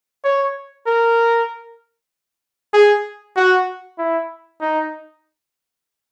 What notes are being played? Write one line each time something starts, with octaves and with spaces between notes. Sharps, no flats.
C#5
A#4
G#4
F#4
E4
D#4